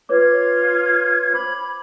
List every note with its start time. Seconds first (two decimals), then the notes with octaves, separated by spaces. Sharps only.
0.09 F4 B4 C#5 D6 G#6
1.33 C5 B5 D6 G#6